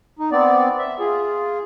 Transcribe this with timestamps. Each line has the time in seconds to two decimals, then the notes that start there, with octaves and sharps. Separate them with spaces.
0.19 D#4
0.32 B3 C4 D5
0.79 E5
1.00 F4 G#4